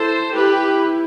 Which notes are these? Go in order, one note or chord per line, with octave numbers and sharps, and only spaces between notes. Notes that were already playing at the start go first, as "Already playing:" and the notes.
Already playing: E4 A4 C5
E4 G4 B4